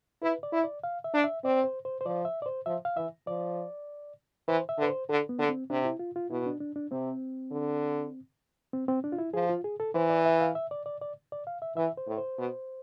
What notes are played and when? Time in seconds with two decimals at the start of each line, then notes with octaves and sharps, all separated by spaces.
0.22 E4 B4
0.43 D5
0.53 E4
0.64 D5
0.84 F5
1.04 E5
1.14 D4
1.24 E5
1.44 C4 D5
1.64 C5
1.85 C5
2.01 C5
2.06 F3 D5
2.25 E5
2.42 D5
2.46 C5
2.66 F3 E5
2.85 F5
2.97 E3 E5
3.27 F3 D5
4.48 E3 C5
4.69 E5
4.78 D3
4.82 B4
4.89 C5
5.09 D3 A4
5.29 B3
5.39 D3
5.49 C4
5.70 C3 D4
5.85 E4
5.99 F4
6.16 F4
6.31 B2 E4
6.46 D4
6.61 D4
6.76 D4
6.91 C3 C4
7.51 D3
8.73 C4
8.88 C4
9.04 D4
9.12 F4
9.18 E4
9.34 F3 G#4
9.50 F4
9.64 G#4
9.80 A4
9.95 E3 C5
10.10 D5
10.26 E5
10.41 F5
10.55 E5
10.71 D5
10.86 D5
11.01 D5
11.32 D5
11.47 F5
11.62 E5
11.77 E3 E5
11.97 C5
12.08 A2
12.18 C5
12.38 B2